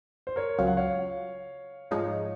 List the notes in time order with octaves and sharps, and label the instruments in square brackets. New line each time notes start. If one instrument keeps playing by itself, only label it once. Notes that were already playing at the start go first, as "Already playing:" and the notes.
[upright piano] C5
A#4 C#5
[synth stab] C#2 C#3 F#3 C#4 F4 [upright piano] F5
[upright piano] F#5
C#5 F5
[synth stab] G#2 F3 G#3 D#4 [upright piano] C#5 F5